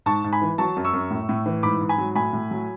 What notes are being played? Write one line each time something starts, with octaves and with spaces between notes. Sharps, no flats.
G#2 A5 C#6
G#2
G#5 B5
E3
F#3 A5 C#6
F#2
C#6 E6
F#2
A2
A2
E3
G#2 B5 D6
G#2
G#5 B5
F#3
A2 G#5 B5
A2
F#3